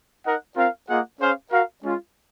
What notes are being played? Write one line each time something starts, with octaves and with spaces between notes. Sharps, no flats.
D#4 A#4 D#5 F#5
C4 F4 A#4 F5
A#3 F4 G#4 D#5 F#5
C#4 G#4 C5 F5
F#4 A#4 F5
G#3 C#4 F4